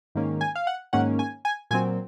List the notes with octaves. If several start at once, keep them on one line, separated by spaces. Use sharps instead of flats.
G#2 D#3 A#3 C#4
G#5
F5
F#5
G#2 D#3 A#3 C#4 F#5
G#5
G#5
A#2 F#3 C4 G#5